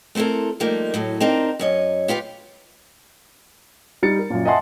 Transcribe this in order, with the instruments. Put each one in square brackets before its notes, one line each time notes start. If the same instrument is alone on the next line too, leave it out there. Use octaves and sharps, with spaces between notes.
[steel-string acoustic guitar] A3 C4 E4 A4 A#4
F3 G3 A3 A#3 D#4
A2 F#3 A3
C4 D4 D#4 A#4
F#2 C#5 D#5
B3 F4 G4 B4
[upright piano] G3 D#4 A6 C#7
A#4
F#2 A#2
D#5 E5 F#5 G#5 A5 C6